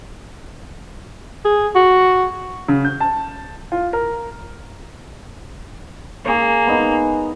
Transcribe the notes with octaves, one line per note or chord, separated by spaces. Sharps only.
G#4
F#4
C#3
G6
A5
F4
A#4
A#3 G#4 C#5
B3 D#4